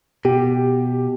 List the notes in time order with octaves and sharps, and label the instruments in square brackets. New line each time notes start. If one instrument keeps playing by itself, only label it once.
[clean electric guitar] B2 [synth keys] G4